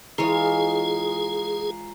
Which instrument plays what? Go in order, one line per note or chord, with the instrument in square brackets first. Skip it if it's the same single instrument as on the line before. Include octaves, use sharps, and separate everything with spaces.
[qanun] E3 C#5 [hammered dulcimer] G#3 F4 [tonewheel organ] G#4 [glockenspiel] A#5 C7